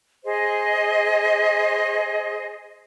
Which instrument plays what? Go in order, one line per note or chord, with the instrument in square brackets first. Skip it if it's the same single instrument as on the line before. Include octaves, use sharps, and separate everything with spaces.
[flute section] G#4 C5 D#5